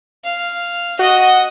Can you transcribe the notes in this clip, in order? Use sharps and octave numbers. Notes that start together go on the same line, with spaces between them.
F5
F#4 D#5